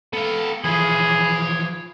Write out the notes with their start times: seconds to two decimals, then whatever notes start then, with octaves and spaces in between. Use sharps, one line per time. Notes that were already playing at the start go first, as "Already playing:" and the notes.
0.13 B3 A4 F5
0.64 E3 F3 G#4 C#5 B5